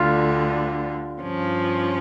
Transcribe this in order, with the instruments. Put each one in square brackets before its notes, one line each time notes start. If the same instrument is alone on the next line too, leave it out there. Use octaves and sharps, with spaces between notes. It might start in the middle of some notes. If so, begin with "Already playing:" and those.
Already playing: [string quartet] D2 D3 G3 [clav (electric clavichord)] F4
[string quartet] G2 F3 C#4